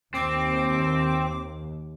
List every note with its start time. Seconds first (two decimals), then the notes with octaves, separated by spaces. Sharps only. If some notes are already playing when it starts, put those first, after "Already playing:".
0.14 D#2 C4 D6